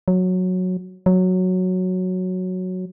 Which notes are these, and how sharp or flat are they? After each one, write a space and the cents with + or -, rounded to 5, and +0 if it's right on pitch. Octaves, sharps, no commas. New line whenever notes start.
F#3 -10
F#3 -5